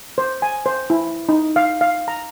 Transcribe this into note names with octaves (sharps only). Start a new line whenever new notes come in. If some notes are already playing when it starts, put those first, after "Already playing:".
C5
G#5
C5
E4
D#4
F5
F5
A#5